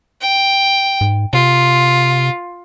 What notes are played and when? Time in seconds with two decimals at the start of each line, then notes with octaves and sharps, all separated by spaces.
0.21 G5
1.01 G#2
1.33 C3 F4